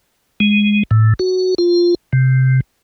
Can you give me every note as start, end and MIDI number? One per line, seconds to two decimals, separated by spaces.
0.40 0.83 56
0.91 1.14 45
1.19 1.55 66
1.58 1.95 65
2.13 2.61 48